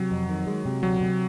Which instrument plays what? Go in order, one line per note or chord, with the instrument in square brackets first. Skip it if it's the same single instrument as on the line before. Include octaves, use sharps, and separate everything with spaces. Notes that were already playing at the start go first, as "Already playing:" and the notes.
Already playing: [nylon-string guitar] C3 [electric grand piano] F#3
[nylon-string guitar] F2
D#3
G#3
C3
[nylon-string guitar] D2 [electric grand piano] F#3
[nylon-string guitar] C3